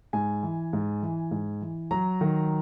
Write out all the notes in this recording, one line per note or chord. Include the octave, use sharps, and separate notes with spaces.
G#2 G#5
E3
G#2
E3
G#2
E3
F#3 A#5
D#3